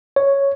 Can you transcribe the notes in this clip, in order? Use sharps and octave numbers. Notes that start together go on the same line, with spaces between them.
C#5